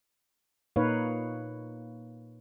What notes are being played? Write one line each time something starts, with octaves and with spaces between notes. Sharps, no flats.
A#2 A#3 D#4 B4 C#5 F5